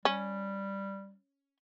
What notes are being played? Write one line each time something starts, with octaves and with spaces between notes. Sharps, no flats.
G3 C#4